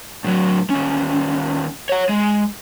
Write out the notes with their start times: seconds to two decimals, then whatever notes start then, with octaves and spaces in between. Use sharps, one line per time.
0.24 A2 F#3
0.70 D#2 C#4
1.89 C#5 F#5
2.09 G#3